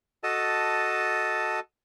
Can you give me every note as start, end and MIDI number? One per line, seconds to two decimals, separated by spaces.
0.23 1.60 66
0.23 1.60 69
0.23 1.60 75
0.23 1.60 81